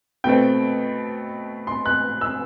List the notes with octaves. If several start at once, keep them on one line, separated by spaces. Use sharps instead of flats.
B2 A3 C4 G5
C6
F#6
E6